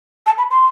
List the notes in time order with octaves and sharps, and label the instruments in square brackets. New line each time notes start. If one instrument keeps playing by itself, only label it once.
[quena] A5
B5
C6